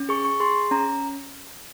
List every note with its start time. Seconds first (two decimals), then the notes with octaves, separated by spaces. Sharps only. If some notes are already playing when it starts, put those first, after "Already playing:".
Already playing: C#4
0.09 G#4 C#6
0.25 C#6
0.40 G#4 C6
0.71 C#4 A#5